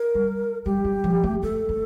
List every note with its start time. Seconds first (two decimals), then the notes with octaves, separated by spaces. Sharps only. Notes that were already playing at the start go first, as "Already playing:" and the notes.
Already playing: A#4
0.14 G3
0.65 G3 G4
0.84 G3
1.04 F3
1.24 A3
1.43 A3 A4
1.69 A3